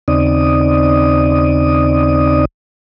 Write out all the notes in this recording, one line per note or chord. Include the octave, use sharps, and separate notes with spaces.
D#2 C#3 C4 D#4 D5 D#6